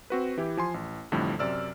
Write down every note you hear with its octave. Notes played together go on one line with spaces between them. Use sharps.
C4 F#4 B4
E3 E4 G4
F3 G#5 C6
A1
A1 F2 A2 D3 G3
F#2 C3 D5 E6 F6